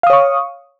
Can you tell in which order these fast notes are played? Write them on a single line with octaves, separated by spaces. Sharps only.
F5 D#6 C#5 C#6